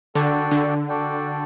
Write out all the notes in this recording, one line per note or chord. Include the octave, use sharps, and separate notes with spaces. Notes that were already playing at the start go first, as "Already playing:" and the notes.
D3 D4 F#4 A4 D5 G5
D3
D4 F#4 A4 D5 G5